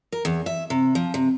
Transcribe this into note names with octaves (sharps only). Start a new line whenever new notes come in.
A#4
E2
E5
C3
F3
C3